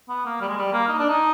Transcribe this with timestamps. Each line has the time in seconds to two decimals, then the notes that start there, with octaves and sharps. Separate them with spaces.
0.09 B3
0.25 A#3
0.41 G3
0.48 G#3
0.57 G3
0.73 A#3
0.88 D#4
0.98 D4
1.09 D#4